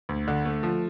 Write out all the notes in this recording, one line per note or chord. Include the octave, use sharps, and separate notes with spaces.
D2
D3
A3
F3